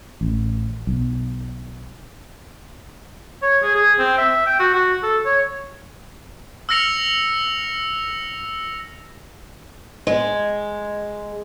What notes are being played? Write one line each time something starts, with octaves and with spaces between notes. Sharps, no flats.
A1
B1
C#5
G#4
G#4
C4
E5
G5
F#4
F#4
A4
C#5
E6 F6 A#6 C#7 F7
G#3